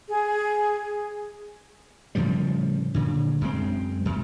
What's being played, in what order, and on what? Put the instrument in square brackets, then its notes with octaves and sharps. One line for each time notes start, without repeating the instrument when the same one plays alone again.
[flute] G#4
[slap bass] A2 C#3 F3 G3
A#2 D3
F#2 G#3 C4
F#2